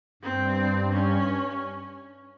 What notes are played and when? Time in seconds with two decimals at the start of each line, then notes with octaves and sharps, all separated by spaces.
0.22 G2 C4
0.91 C#4